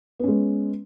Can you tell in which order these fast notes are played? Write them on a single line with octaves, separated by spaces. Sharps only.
B3 C#4 G#3